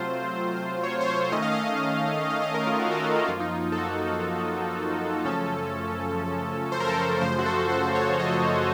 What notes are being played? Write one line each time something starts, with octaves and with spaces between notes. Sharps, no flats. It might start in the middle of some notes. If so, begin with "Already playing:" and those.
Already playing: C3 F#3 A3 C4 F4 C5
C#5
C5
C#5
D#3 A3 C#4 D#5
F5
D#5
F5
D#5
A#4
F4
F#4
A4
F#4
F4
F#2 F3 A#3 F4
D#4
F4
A4
F#4
F#2 C#3 F3 A3 C#4 A4
C5
A#4
A4
A#4
F#2 C#3 F3 A3 C5
F#4
A4
C5
C#5
C#5
D#5